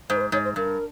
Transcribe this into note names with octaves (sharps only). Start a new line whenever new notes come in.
G#2 C5
B4
C5
G#2 C#5
C5
G2 A#4